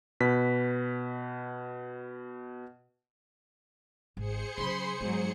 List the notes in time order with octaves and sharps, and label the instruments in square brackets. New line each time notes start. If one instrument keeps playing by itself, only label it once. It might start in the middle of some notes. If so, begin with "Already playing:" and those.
[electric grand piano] B2 B4 B6
[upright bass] G#1 [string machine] G#4 C5 C#7
[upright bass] C#3 F#3 [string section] B5 C6
[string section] G#2 F#3 [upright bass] B3